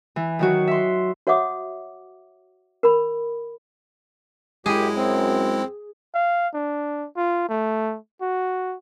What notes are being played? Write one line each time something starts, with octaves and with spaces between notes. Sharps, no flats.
E3
D#3 F#3 F#4
E5 C6
F#4 C#5 E5 F#5 D6 D#6
A#4 B5
F#2 G#3 E4 G4 G#4
C4
F5
D4
F4
A3
F#4